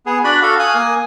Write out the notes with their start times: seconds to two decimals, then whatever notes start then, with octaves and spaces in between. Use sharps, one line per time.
0.06 B3 G#4
0.24 D4 F#4 D5 B5 F#6
0.42 F#4 A4 F5
0.59 F5 G#5 D#6 F#6
0.75 A#3 G#5 D#6